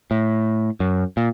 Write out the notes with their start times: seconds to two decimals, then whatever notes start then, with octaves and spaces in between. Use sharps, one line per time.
0.11 A2
0.80 F#2
1.17 A#2